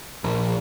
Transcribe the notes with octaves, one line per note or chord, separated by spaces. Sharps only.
A#1